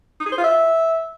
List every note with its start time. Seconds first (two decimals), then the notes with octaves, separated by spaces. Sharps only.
0.20 D#4
0.26 G#4
0.32 C5
0.38 F4
0.44 E5